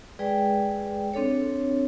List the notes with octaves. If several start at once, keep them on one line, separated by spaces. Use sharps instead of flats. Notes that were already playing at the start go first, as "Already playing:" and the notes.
G#3 G#4 B4 D5 G5
C4 D4 A4 C#5